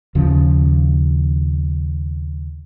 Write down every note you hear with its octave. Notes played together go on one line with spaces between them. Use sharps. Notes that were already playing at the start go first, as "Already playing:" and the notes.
D#2 C#3 F3